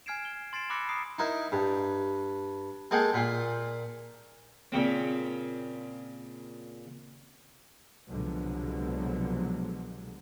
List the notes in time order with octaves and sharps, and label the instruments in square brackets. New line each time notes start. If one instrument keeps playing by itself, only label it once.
[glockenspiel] G#5 F6 G#6 C7 D7 E7
G7
C6 A6 C7 D7 E7
B5 D6 E6 F#6 A#6 C#7
A#5 D#6 C7 D7
[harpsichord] D#4 E4 A#4
G2
G#3 A#3 G#4 A4 G5
A#2 F4
A#2 C#3 C4
[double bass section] C2 B2 D3 F3 F#3 G#3